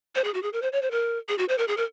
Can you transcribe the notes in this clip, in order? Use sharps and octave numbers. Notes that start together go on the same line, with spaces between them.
C5
G#4
F#4
G#4
A#4
C5
C#5
C5
A#4
G#4
F#4
C5
A#4
G#4
A#4